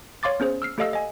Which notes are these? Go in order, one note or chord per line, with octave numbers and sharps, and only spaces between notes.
C#5 F5 C6 D6 A6
B3 C#4 G#4 C5
E6 F6 C7
A3 G4 A4 D#5 F5 E6
D#5 G#5